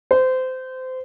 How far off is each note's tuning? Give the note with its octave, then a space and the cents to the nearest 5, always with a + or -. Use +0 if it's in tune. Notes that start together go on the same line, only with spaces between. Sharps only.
C5 -25